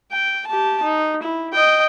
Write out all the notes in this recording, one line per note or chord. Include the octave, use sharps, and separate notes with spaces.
G5
G4 A5
D#4
E4
D#5 G5